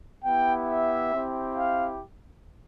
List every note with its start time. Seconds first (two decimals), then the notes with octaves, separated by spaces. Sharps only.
0.24 B3 E4 G4 G5
0.69 E5
1.13 C4 E4 G4
1.57 F5